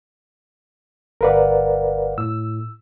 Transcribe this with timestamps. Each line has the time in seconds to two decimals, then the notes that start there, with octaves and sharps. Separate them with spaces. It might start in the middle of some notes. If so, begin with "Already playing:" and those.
1.21 G1 A#4 B4 D5 F5 F#5
2.18 A2 E6